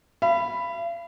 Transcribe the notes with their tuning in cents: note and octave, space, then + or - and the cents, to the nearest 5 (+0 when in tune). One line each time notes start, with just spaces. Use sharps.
F5 -45 B5 +5